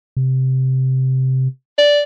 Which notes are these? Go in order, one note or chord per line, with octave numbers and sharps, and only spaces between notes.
C3
D5